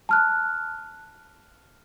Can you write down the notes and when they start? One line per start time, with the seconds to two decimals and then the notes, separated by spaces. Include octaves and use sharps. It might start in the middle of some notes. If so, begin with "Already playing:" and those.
0.09 A5 F6 F#6